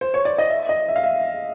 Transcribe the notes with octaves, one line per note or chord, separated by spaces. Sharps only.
C5
C#5
D5
D#5
E5
D#5
E5
F5
E5